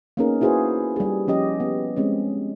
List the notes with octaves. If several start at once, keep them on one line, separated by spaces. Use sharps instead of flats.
A#3 B3 C#4 D#4 G#4 A#4
E4 F#4 G#4 B4 C5
G3 G#4
F3 C#4 G4 D#5
B3
G#3 C4 C#4